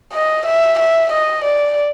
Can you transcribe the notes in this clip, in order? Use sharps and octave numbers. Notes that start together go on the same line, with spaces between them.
D#5
E5
E5
D#5
D5